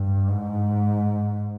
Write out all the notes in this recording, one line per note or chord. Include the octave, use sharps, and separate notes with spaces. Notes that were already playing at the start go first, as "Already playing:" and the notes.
Already playing: G2
G#2